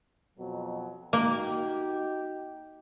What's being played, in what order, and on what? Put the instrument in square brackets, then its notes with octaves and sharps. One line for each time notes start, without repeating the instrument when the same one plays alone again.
[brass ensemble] F2 B2 F#3
[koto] A#3 [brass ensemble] D#4 F#4 G4